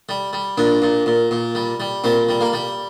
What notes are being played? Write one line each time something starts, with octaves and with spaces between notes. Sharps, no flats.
G3
G3
A#2 D4
A#2
A#2
A#2
G3
G3
A#2 C4
G3
A#3
G3